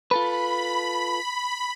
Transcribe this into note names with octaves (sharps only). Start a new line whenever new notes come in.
F4 A4 B4 B5